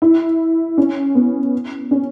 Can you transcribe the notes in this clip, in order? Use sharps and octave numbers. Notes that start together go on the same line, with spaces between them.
E4
C#4
B3
C#4